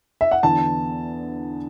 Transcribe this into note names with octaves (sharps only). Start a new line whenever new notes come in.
E5
F#5
E2 D3 B3 A5